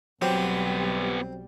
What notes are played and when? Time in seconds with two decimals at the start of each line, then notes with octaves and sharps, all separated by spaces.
0.22 B1 F#3 G3 B3 C4 G4